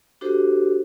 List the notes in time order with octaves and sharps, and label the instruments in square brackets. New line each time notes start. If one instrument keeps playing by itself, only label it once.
[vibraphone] D4 F#4 G4 A4 C5